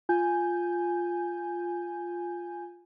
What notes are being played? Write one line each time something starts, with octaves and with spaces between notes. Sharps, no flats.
F4 G#5 G6